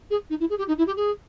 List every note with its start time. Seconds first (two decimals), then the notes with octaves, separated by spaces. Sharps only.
0.10 G#4
0.30 D#4
0.40 E4
0.49 G#4
0.58 G4
0.68 D#4
0.78 E4
0.87 G4
0.96 G#4